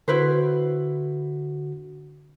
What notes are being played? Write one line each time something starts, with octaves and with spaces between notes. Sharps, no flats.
D3 E4 F#4 B4 C5